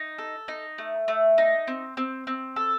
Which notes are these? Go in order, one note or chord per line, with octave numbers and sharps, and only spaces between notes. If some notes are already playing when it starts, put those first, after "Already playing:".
Already playing: D#4
A4
D#4
A3
A3
D#4
C4
C4
C4
A4